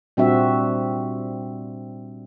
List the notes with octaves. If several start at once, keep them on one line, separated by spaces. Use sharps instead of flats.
A#2 G3 C4 D4 F#4 E5